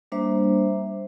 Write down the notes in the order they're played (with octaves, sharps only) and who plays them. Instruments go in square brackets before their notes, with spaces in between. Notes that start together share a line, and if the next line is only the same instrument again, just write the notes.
[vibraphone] G3 A#3 D4 C5 E5